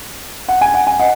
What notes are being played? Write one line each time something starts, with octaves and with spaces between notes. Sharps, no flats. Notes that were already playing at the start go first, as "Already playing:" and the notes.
F#5
G#5
F#5
G#5
D#5 F#5